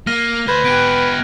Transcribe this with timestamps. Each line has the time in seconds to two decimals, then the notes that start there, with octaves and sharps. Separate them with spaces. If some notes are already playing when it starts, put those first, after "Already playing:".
0.07 A#3 F6 A#6 D#7
0.48 D2 B4 C5 G6 G#6
0.65 B3 G4 F#6 G#6 D7